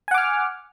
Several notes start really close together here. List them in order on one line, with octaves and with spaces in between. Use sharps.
G#5 F#5 D6 F6